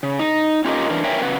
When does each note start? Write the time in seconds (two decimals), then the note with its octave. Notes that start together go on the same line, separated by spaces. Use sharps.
0.03 C#3
0.19 D#4
0.65 C#4 F4 G4 A#4 D#5
0.89 E3 D4 A#4
1.04 A#4 B4 C#5 E5 G5 G#5
1.21 C#3 F#3 B4 F#5